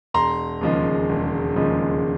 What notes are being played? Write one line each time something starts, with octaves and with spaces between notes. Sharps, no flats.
E1 A#5 C6
D#2 C#3 F3 G#3
E1
D#2 C#3 F3 G#3